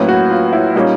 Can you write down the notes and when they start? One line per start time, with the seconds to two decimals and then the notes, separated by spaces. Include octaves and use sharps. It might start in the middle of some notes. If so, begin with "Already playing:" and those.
Already playing: A2 F#3 A#3 C#4 B4
0.08 F#4
0.31 F4
0.53 E4
0.75 A#2 G3 A#3 C#4 D#4